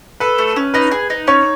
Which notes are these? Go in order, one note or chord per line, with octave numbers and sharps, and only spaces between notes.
A4 B4
A3
C#4
D#4 B4
G#4
D#4
C#4 C#5